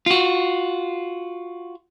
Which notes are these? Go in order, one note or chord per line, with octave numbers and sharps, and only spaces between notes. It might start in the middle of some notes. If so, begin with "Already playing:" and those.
F4 F#4